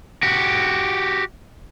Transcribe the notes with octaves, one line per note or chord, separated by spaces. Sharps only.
F#4 G4